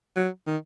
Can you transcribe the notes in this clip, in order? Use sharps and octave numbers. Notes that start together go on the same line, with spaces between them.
F#3
D#3